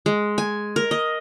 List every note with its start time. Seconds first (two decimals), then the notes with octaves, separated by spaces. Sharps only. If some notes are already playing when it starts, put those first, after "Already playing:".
0.06 G#3
0.38 G#5
0.76 A#4
0.91 D#5